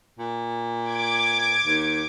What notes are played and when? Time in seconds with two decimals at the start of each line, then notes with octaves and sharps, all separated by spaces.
0.18 A#2
0.89 D6 G#6 D7
1.65 D#2